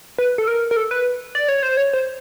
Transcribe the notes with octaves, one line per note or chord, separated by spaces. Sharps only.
B4
A4
A#4
A#4
A4
B4
D5
C#5
C5
C#5
C5